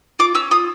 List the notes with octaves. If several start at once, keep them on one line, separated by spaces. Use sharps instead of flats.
F4 D6
C#4 E6
F4 D#6